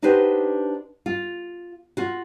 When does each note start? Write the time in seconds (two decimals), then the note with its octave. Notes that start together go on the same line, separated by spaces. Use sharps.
0.02 D4 D#4 F#4 G4 B4 C5
1.06 F4
1.97 F4 F#4